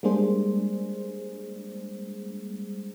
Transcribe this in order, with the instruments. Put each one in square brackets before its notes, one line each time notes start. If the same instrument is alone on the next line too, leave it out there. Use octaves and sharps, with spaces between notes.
[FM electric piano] G3 G#3 A#3 D4 G#4 C5